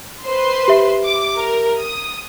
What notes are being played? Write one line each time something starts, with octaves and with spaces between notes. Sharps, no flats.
B4 C5 C6
G4 E5
D6
A#4
D#6